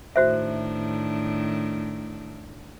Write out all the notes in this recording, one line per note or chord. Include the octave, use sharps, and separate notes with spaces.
A2 D#3 D4 F#4 C5 E5